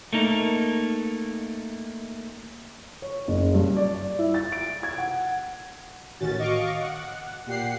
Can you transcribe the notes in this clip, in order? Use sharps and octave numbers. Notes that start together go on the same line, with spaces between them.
A3 A#3 D#4
C#5
F#1
G2
D5
E4
A6
D7
G#6
F#5
A1 D#3 C#4 F#4 A6
D#5 F5 C#6 D6
F#5
A#2 G4 F#5 C7